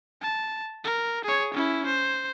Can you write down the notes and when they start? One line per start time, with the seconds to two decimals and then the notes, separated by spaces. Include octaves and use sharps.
0.22 A5
0.84 A#4
1.24 G#4 C#5
1.54 C#4 E4
1.86 C5